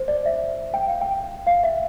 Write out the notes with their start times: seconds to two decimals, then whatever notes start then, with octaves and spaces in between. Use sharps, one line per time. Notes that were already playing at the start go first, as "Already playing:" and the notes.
Already playing: C5
0.08 D5
0.26 E5
0.74 G5
0.88 F5
1.01 G5
1.47 F5
1.63 E5